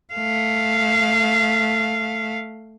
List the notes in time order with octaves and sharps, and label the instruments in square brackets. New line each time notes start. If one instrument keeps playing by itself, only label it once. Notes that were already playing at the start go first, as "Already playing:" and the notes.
[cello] A3 F5